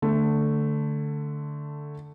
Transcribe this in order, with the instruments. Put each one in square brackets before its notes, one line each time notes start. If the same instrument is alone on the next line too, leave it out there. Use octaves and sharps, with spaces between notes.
[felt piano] D3 A3